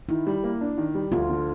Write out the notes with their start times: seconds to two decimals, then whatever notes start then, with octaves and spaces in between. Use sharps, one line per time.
0.09 D#3 E4
0.27 G3
0.44 A#3
0.61 D4
0.78 D#3
0.95 G3
1.12 D2 F4
1.30 D3